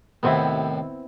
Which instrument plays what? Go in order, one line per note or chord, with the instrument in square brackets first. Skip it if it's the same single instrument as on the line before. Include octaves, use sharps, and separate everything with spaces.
[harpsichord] D#2 A2 C3 [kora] B3 C4 E4